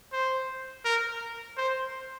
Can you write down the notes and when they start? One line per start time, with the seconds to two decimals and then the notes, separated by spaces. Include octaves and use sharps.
0.12 C5
0.85 A#4
1.57 C5